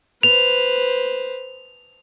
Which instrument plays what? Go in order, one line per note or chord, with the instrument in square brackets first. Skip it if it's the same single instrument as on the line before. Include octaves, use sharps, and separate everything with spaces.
[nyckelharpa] B4 C5 [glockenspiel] F7